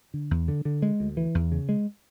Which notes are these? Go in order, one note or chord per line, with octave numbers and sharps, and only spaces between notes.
D3
E2
D3
D3
G#3
D2
E3
E2
C#3
G#3